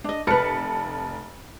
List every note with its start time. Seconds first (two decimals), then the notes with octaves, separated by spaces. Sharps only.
0.04 D4 D#5
0.27 F1 A#4 B4 A5 C#7